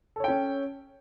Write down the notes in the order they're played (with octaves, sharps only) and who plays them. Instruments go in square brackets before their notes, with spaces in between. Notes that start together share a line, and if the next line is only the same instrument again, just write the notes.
[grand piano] A4
C#5
G5
C#4